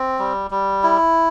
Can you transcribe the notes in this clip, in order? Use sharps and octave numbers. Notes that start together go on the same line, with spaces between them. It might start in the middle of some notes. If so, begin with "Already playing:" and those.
Already playing: C4
G3
G3
E4